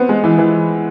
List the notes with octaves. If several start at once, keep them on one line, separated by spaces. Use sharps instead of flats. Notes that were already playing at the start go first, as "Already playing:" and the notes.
Already playing: B3 C4
G#3
E3
E3